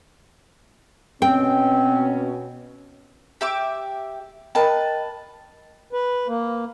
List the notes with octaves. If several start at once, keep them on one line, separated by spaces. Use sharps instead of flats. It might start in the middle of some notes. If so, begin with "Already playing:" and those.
B2 C4 C#4 G5
G4 E5 D6
A#4 B4 D#5 G5 A5
B4
A#3